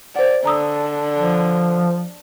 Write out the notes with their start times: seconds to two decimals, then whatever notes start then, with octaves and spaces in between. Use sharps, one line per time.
0.16 C5 D5 F#5
0.46 D3 A#5 D#6 E6
1.16 F3